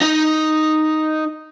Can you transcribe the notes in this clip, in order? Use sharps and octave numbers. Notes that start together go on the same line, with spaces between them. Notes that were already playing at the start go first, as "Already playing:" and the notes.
D#4 D#5